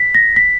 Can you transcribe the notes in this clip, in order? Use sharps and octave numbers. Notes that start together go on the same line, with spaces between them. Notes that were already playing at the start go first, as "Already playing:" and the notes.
Already playing: B6
A#6
B6